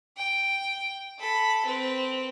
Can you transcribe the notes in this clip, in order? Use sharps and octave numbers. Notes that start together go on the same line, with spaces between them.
G5
A4 B5
C4 B4